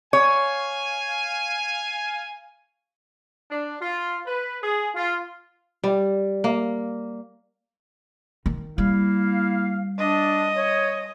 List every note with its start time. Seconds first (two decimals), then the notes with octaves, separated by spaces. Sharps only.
0.13 C#5 F5 G#5
3.50 D4
3.80 F4
4.26 B4
4.62 G#4
4.95 F4
5.84 G3
6.44 A#3
8.46 D#3
8.78 G3 A#3 E4 F5
9.99 D4 D#5
10.57 C#5